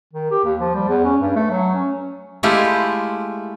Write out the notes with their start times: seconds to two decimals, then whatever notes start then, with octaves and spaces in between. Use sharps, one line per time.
0.13 D#3
0.31 G4
0.45 D#2
0.60 F3
0.75 G3
0.88 E2
1.04 C#4
1.21 G2
1.36 A3
1.51 F#3
1.74 C#4
2.43 G#3 A3 E4 F4 G4